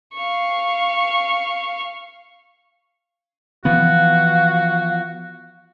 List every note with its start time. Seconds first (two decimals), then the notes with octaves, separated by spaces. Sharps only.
0.14 F5 C#6
3.65 E3 F3 B3 F#4 F5